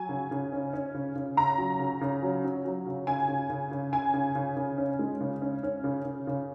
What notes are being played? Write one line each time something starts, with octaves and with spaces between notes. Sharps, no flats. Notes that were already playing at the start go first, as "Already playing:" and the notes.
Already playing: F#3 G#5
C#3
C#3
C#4
C#4
C#3
C#3
C#3 A#5
F#3
C#3
C#3
F#3
C#4
F#3
C#3
C#3 G#5
C#3
C#3
C#3
C#3 G#5
C#3
C#3
C#3
C#4
G#3
C#3
C#4
C#4
C#3
C#3
C#3